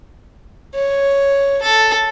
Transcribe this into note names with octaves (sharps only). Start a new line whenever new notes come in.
C#5
A4